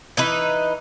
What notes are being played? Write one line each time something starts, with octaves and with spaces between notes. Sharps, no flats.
E3 D#4 B4